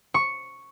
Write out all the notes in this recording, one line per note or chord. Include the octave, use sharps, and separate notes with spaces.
C#6